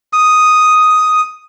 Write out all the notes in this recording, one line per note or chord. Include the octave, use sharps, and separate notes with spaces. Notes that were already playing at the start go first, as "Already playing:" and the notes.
D#6